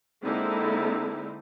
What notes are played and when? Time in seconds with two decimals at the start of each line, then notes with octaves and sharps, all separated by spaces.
0.24 D3 G#3 A#3 C4 D#4 E4